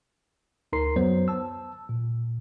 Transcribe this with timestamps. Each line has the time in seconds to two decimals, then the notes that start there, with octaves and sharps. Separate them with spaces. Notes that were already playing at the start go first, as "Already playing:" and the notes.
0.73 D2 D#4 A#4 A#5 C6 C7
0.96 F#2 F#3 B3 C5
1.28 A5 E6
1.89 A#2